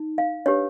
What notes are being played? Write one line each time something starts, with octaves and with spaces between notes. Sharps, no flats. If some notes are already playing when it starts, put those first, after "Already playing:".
Already playing: D#4
F5
D4 G4 B4 C#5